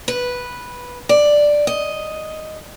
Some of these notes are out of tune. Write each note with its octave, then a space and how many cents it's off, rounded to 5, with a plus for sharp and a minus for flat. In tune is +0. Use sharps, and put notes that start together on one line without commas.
B4 -5
D5 +5
D#5 +5